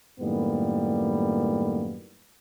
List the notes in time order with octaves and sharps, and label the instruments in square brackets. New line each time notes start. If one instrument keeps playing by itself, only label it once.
[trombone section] F#2 A2 D#3 G3 A#3 B3